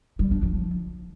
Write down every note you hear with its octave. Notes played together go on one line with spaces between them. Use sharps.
G3
D4
F3